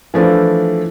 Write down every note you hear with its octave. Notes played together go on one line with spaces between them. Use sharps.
E3 F3 A3 D4 E4